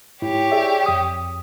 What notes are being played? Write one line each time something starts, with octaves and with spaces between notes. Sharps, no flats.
G#2 E4 G4 C#5
G#4 D5 E5
F2 D#6